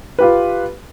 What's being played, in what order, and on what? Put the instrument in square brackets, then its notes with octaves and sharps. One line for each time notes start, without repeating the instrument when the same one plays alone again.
[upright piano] F4 G4 B4